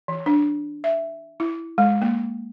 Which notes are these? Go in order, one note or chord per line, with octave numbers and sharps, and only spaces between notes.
E3
D4
E5
E4
G#3
A#3